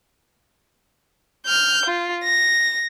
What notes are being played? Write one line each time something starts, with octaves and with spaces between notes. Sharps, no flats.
F6 G6
F4
A#6